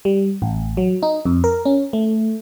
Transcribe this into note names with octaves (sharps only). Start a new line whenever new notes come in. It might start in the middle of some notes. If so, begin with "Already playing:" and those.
G3
A1
F#3
D#4
F2
A#4
C#4
A3